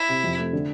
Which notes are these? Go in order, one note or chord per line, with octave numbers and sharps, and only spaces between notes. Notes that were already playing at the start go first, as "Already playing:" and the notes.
Already playing: E4
C3
F2
A3
D3